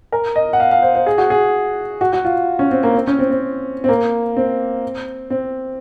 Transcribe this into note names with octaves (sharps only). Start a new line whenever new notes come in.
A#4
D#5
F#5
F5
F5
C5
C5
G#4
F#4
G#4
F#4
F#4
F4
C#4
C4
A#3
C4
C#4
C4
C4
C4
A#3
C4
C4